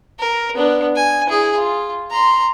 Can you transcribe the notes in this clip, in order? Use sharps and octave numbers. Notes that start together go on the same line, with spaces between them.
A#4
B3 D4
G#5
E4 G#4
F4
A#5 C6